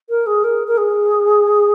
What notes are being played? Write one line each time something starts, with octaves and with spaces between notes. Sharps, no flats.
A#4
G#4
A#4
A#4
G#4